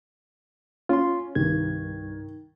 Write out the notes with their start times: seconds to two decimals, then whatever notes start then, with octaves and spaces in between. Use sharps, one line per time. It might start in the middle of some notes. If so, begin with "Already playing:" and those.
0.89 C#4 F4 C6
1.35 C2 G2 D#3 G#6